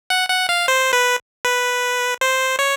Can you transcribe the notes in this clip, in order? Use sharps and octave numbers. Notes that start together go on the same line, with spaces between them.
F#5
F#5
F5
C5
B4
B4
C5
C#5